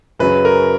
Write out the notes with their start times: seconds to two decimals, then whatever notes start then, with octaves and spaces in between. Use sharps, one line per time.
0.20 F#2 C#3 F#3 C#4 B4
0.45 A#4